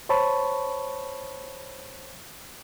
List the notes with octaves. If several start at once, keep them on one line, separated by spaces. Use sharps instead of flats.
C5 C#5 A5 B5 C#6